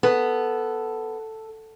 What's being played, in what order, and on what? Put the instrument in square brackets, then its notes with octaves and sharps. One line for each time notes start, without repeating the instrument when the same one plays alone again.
[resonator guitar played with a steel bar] B3 [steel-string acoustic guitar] A4